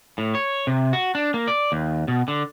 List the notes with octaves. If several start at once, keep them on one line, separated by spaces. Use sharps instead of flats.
A2
C#5
C3
F#4
D4
A#3
D5
D#2
B2
D3